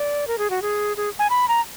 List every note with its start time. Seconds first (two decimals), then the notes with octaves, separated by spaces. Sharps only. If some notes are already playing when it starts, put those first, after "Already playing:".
Already playing: D5
0.27 A#4
0.38 G#4
0.50 F#4
0.62 G#4
0.97 G#4
1.19 G#5
1.30 B5
1.48 A#5